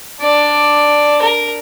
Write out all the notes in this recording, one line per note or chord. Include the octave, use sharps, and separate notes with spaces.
D4 D5
A#4